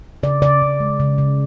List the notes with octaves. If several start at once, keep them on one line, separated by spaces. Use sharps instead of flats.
C#3 D5
C#3 D5
C#3
G#3
C#3
C#3